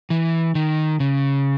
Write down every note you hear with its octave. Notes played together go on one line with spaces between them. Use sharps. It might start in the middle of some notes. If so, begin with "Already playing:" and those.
E3
D#3
C#3